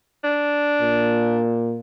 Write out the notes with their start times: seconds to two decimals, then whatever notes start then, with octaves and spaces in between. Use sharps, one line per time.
0.24 D4
0.82 A#2